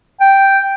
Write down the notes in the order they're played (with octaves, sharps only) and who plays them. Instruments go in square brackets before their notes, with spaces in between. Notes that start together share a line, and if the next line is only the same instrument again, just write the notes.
[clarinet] G5